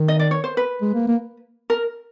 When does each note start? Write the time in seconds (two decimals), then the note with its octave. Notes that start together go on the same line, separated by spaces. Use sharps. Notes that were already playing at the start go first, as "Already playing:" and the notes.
Already playing: D#3
0.08 D#5
0.19 D5
0.31 C#5
0.44 C5
0.57 B4
0.82 G#3
0.95 A#3
1.07 A#3
1.70 A#4